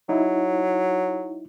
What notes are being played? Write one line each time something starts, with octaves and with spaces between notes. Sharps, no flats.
F#3 D#4 E4